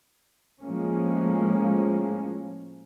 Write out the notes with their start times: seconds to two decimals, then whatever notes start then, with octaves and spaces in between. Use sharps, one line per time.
0.63 A2 F3 G#3 A#3 C#4